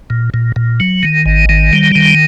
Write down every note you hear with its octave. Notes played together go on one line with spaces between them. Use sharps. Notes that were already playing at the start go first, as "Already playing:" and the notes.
A#2
A#2
A#2
F#3
D#3
G#1
D#3
G3
D#3